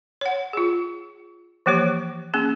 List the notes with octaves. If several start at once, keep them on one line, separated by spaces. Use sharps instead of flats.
C#5 F#5
F4 G#4
E3 F3 A#3 G4 C#5
A#3 C#4 G#4